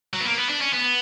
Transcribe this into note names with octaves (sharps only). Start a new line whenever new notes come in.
F#3
B3
A#3
B3
D4
C#4
B3